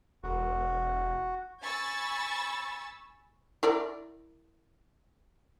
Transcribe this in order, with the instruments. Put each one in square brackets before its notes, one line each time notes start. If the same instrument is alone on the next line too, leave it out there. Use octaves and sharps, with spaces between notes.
[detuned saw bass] E1 [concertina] F#4
[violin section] G#5 B5 C#6 E6 A6
[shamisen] E4 A#4 D5